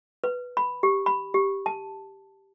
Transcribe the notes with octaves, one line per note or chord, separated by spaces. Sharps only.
B4
B5
G4
B5
G4
A5